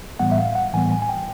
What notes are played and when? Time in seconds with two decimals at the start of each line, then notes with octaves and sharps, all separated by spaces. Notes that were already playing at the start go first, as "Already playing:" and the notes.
0.19 A2 E3 G3 B3 F#5
0.32 E5
0.38 F5
0.55 F#5
0.73 A2 E3 G3 B3 G#5
0.92 G#5
1.02 G#5
1.09 G5